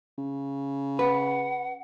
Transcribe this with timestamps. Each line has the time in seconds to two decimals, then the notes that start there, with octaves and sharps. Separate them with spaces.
0.18 C#3
0.99 B4 F#5